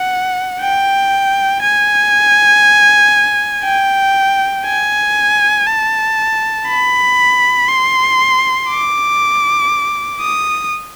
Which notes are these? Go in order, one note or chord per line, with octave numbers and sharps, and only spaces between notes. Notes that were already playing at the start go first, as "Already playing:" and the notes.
Already playing: F#5
G5
G#5
G5
G#5
A5
B5
C6
D6
D#6